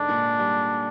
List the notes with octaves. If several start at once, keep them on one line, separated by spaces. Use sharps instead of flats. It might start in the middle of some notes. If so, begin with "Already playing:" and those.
Already playing: G#2 D3 D4
A#2
G3